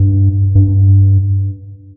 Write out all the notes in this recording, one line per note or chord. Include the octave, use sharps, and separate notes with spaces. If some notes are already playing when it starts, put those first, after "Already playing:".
Already playing: G2
G2